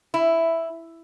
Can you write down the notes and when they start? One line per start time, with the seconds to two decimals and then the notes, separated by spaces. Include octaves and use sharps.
0.14 E4